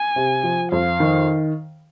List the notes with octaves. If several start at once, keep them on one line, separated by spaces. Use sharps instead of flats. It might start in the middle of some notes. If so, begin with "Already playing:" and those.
Already playing: G#5
C3
F3
F2 F5
D#3